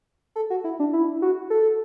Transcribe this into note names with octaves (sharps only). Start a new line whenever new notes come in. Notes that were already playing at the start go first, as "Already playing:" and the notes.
A4
F#4
E4
D4
E4
F#4
A4